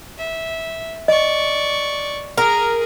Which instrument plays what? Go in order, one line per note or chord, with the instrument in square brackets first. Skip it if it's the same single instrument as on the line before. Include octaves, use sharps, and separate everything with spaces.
[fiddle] E5
[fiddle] D5 C#6 [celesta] D#5
[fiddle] G#4 [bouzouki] A#4